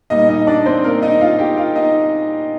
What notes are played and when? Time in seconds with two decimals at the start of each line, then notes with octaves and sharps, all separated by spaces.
0.10 A#2 G3 D#4 D#5
0.29 D#4 D#5
0.47 D4 D5
0.66 C4 C5
0.83 A#3 A#4
1.02 D#4 D#5
1.21 F4 F5
1.39 G4 G5
1.57 F4 F5
1.75 D#4 D#5